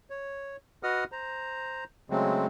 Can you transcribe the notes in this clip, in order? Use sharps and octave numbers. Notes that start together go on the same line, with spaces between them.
C#5
F#4 B4 D#5 F#5 D#6 F6
C5 A#5
C#3 F#3 G#3 A3 C4